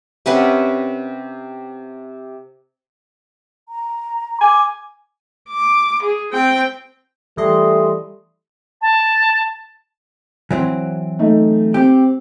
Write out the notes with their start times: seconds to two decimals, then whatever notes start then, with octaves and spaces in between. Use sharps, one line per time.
0.26 C3 C#4 B4 F#5
3.69 A#5
4.41 G#5 D6
5.49 D6
6.03 G#4
6.33 C4 G5
7.37 E3 G3 A3 D#5 C6
8.81 A5
10.51 E3 F#3 C4
11.19 A3 D#4
11.74 C4 G4